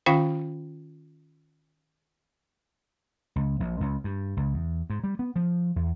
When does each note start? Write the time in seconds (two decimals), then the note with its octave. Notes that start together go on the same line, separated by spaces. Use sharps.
0.06 D#3 C#4 F4 F5 G5 B5
3.36 C#2
3.60 A#1
3.80 C#2
4.04 G2
4.37 C#2
4.54 E2
4.90 G#2
5.04 G3
5.19 B3
5.36 F3
5.76 E2